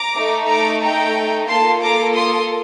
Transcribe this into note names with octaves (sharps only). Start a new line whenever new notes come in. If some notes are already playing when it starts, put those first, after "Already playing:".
Already playing: A#5 D6
A3 D#4 A4
A#5 D6
G5 A#5
A#3 F4 A4 A5 C6
A#5 D6
C6 D#6